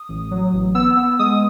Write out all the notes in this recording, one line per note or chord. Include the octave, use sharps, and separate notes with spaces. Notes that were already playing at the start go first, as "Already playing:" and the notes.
Already playing: D#6
A1
F#3
A1
B3 E6
B3
G#3 D#6